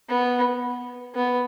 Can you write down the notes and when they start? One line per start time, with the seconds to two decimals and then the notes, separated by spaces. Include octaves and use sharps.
0.09 B3
1.15 B3